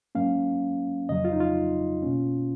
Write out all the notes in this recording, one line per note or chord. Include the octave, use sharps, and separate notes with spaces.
G#2 F#3 A#3 C#4 F5
F2 C#3 F#3 D#5
F4
D#4
F4
B2 A#3 C#4